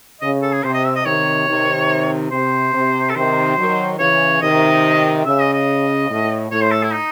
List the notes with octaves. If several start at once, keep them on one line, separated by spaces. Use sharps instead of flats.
C#3 D#5
A4
G#4
C3 C5
D#5
E5
D#5
C3 D#3 C#5
C3 D#3
C3 C5
C3
A4
C3 D#3 C5
D#3 F#3
C#3 E3 C#5
C3 D#3 D#5
C#3 E5
D#5
D#5
A2
A2 C#5
C5
A4
E4
D#4